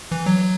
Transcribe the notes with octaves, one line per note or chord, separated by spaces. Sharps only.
E3
F#3